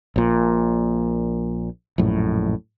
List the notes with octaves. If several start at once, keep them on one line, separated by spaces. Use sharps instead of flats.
A#1 A#2
A#1 F#2 A2